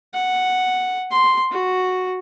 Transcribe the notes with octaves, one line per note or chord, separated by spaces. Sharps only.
F#5
C6
F#4